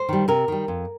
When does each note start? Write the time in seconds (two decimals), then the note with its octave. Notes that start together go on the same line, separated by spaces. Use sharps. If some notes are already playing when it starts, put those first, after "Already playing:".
Already playing: C5
0.09 D#3 G3
0.28 C3 A#4
0.48 D#3 G3
0.68 F2